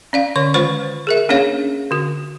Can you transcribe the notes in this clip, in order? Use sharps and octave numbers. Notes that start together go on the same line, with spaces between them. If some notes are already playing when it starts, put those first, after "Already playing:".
C#4 D5 F5
D3 C#5 C#6
D#3 G#3 F4 B4 C5 C#6
G#4 A#4 E5
A#3 C#4 D4 G#4 C#5 F5
D3 F#4